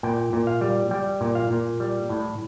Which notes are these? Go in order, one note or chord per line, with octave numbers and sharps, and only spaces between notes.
A#2 G5
A#2
F5
G3
G3 G5
A#2
F5
A#2
G3
A2